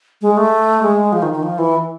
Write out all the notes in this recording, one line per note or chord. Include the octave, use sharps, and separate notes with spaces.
G#3
A3
G#3
F3
D#3
D#3
F3
E3